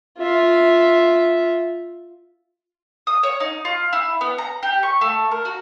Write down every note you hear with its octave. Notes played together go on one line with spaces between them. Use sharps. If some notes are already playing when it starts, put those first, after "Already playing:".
F4 E5
D#6
C#5
D#4
F4
E4
B3
A#5
G4
C#6
A3
A#4
F#4